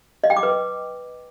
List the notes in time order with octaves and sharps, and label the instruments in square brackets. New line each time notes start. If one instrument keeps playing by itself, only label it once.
[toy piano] D#5
G5
D6
B4